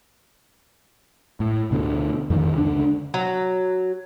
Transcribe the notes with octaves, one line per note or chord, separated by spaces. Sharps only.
A2
D2 B2 D3
F2 D3 D#3
C#2 D3 D4
F#3